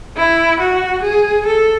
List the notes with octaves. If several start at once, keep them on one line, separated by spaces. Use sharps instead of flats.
E4
F#4
G#4
A4